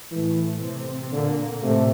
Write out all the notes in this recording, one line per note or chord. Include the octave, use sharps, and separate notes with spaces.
A2 E3 A3
C3 C4
A#2 D3 A#3
A2 C3 A3